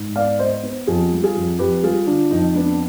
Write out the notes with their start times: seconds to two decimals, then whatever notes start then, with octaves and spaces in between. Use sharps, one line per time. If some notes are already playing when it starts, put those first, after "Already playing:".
Already playing: G#2
0.16 B3 D5 F5
0.39 B3 C5 D#5
0.63 B3
0.87 F2 F4 G#4
1.12 G3
1.23 F4 G#4
1.36 F2
1.59 F2 G4 B4
1.83 G3 F4 G#4
2.07 D3 D4 F4
2.31 F2 D#4
2.55 B3 D4